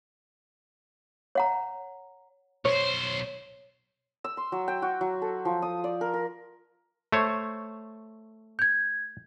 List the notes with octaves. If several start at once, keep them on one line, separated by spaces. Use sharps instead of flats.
C#5 F#5 A#5
B1 C5 C#5
E6
C6
F#3
G5
F#4
F#3
A4
F3
D#6
D5
A#4
A#4
A3 C5 C#5
G6 G#6